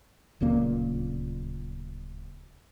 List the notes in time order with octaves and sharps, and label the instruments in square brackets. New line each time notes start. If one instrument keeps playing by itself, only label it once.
[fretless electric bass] D1 C#2 A#2 A#3